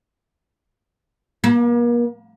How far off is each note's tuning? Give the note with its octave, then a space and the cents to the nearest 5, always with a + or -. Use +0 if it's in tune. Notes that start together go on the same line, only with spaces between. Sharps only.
A#3 +40